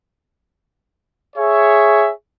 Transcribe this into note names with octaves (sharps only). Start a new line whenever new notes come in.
G#4 C#5 E5